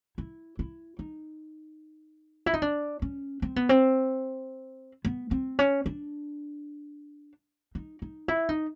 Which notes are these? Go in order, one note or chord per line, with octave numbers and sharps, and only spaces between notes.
E4
E4
D#4
E4
D#4
D4
C#4
C4
B3
C4
B3
C4
C#4
D4
D#4
D#4
E4
D#4